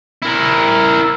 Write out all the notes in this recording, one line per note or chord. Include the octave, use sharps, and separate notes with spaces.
E4 A#4